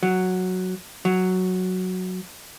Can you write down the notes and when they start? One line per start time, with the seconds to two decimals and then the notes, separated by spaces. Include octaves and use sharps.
0.03 F#3
1.05 F#3